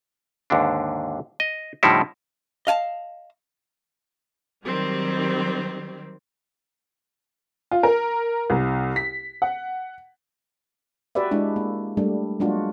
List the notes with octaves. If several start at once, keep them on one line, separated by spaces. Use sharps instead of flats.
D#2 G#2 D3 D4
D#5
A2 D3 F3 G3 D#4 E4
D#5 F5 G#5 A5
D#3 F#3 G3 C4
F4
A#4
C2
B6
F#5
F#4 G4 B4 D5 E5
G#3 D4 E4
A#3
G3 A3 D4
F#3 G#3 A#3 D4 F4 F#4